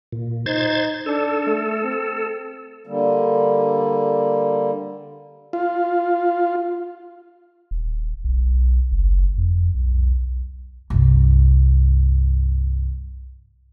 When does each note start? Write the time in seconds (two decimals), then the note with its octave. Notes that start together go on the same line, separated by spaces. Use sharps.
0.12 A#2
0.46 D#4 C5 G#6 A6
1.06 D4 A4
1.46 A3
1.84 C4
2.87 D3 G3 A#3
5.53 F4
7.71 D#1
8.24 B1
8.92 F#1
9.38 F2
9.74 B1
10.90 C2 G2